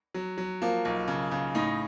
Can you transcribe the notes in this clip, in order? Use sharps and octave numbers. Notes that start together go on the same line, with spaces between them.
F#3
F#3
F3 A#3
B1
C#3
C#3
A2 D#4